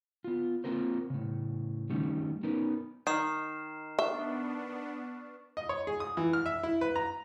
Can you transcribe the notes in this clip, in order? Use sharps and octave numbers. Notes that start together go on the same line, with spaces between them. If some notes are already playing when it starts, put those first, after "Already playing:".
B3 F4
A#3 C4 F4 A#4 C5
A2 C#3
D#3 G3 A3 C#4 D#4
B3 C#4 D#4 A#4 B4
D#3 F6 C7 E7
B3 D4 E5 C#6
D#5
C#5
G#4
D#6
E3
F6
E5
E4
B4
A#5